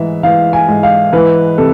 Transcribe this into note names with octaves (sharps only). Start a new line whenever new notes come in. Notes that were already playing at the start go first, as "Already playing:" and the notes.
Already playing: G#2 E3 E5
E3 F5
G#5
G#2
F5
E3 B4
C3 A4